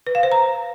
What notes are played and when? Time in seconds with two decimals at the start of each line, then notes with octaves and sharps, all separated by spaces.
0.07 B4
0.15 F5
0.23 C5
0.32 A#5